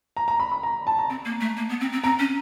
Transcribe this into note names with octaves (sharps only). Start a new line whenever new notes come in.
A#5
A#5
B5
B5
A#5
A5
A#5
C4
A#3
A3
A#3
B3
C4
C4
C4 A#5
C#4